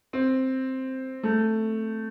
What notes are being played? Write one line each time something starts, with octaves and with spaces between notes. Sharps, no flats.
C4
A3